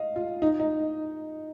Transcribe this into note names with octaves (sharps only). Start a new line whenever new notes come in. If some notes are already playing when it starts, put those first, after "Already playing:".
Already playing: D#5 F5
F4
D#4
D#4